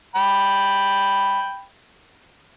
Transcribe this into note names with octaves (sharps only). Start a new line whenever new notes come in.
G5 B5